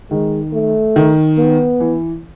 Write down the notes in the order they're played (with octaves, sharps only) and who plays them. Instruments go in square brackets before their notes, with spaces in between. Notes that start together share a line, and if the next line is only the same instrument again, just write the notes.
[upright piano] D#3 [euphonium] G#3
[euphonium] A3
[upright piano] D#3
[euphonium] B3
[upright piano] E3